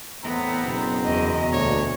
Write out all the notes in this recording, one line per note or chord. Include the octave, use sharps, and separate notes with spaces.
E2 A2 B3 C4 A#5
F#1 B2 A#5
E2 D#5
D2 A#2 C#5